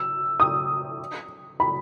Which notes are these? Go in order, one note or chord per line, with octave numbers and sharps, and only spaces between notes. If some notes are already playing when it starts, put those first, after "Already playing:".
Already playing: E6
D#6
B5